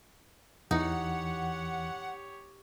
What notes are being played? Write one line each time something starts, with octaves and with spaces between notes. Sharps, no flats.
E2 E3 D#4 G4 C#5 F#5